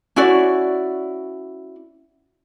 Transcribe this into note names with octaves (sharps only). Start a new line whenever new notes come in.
C#4 E4 F#4 D5